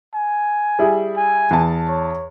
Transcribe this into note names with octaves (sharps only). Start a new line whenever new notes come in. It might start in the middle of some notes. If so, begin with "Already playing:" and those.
G#5
G3 E4 G#4
G#5
E2 A5
C#5